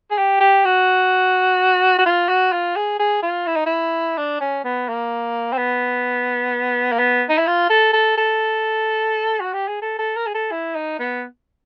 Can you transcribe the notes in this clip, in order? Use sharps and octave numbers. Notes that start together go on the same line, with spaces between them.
G#4
G4
G4
F#4
F#4
F4
F#4
F4
G#4
G#4
F4
E4
D#4
E4
D4
C#4
B3
A#3
C4
B3
A#3
B3
D#4
E4
F4
A4
A4
A4
F#4
G4
G#4
A4
A4
A#4
G#4
A4
E4
D#4
B3